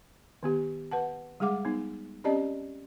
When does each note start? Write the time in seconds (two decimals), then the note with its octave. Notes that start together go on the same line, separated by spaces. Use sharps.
0.43 D#3 B3 G4
0.91 B4 F#5 A5
1.40 G3 G#3 G#4 F#5 D6
1.65 B3 D#4
2.24 C4 C#4 G4 D5 D#5 A5